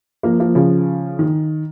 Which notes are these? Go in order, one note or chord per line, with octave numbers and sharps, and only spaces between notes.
F3 A#3
F3 A#3
C#3 F3
D#3